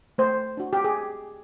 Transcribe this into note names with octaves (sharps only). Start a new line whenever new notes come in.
A3 C5
D4 F#4
G4
G#4